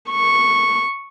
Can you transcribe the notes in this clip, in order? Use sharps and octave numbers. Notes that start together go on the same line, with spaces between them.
C#6